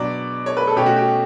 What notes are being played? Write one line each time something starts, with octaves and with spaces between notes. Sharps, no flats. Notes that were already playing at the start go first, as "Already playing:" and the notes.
Already playing: B2 F#3 B3 D4 D5
C#5
B4
A4
B2 A3 C#4 G4
F#4
G4